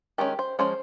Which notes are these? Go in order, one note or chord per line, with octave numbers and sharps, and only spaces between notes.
D#3 G#3 C#4 G4
C5
F3 G#3 C#4 C5